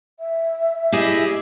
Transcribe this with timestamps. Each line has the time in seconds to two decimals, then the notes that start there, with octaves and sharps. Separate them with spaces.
0.20 E5
0.92 E4 G4 G#4 D#5